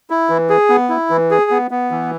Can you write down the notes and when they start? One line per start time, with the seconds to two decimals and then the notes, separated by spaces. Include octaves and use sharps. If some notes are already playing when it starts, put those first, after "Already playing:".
0.10 E4
0.30 E3
0.49 G#4
0.69 B3
0.90 E4
1.10 E3
1.31 G#4
1.51 B3
1.71 B3
1.91 E3